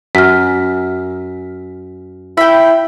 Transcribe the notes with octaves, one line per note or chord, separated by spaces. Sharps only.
F#2 F6 B6
E4 G5 B5 E6